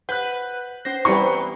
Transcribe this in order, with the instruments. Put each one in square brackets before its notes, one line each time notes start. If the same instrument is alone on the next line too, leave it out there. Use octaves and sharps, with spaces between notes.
[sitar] B4 [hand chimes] F#5 [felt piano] F#6 G6
[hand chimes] C#4 A#6 [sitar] C5
[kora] E3 G3 B3 [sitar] C4 [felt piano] B4 C#6 [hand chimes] A#5